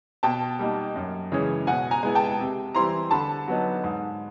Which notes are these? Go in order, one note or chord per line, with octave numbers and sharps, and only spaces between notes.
B2 G5 A5
G3 A#3 D#4
F#2
C#3 E3 G#3 C#4
B2 F#5 G#5
G#5 A#5
G#3 B3 E4
G5 A5
C3
E3 G3 C4 E4 A#5 C6
D3 A5 B5
F#3 B3 D#4
G#2